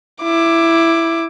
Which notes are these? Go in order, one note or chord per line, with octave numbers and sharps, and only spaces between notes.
E4 D6